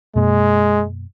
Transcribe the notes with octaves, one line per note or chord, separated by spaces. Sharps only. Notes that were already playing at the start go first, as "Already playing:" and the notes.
F#2 B2 G#3 A#3